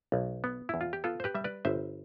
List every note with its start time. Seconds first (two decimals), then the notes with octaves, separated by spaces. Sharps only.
0.12 B1
0.44 B3
0.69 E2 E4
0.81 F4
0.93 G4
1.04 B3 F4 A4
1.20 C5
1.24 G4 B4
1.35 G3 E5
1.44 B4 D5
1.65 G1 C5 E5